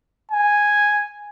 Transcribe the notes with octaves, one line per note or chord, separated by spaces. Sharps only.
G#5